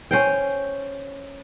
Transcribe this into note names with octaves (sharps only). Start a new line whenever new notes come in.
C#4 C5 G5